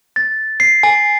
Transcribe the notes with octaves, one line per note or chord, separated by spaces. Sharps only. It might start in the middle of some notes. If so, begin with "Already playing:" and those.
A6
C7
G#5